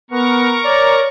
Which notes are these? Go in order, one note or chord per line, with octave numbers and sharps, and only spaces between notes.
B3 A#4 A#5 C#6
C#5 D5